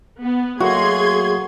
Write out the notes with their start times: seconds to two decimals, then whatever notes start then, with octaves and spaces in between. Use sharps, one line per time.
0.21 B3
0.60 F#3 A3 A#3 F#4 G#4 C6 G#6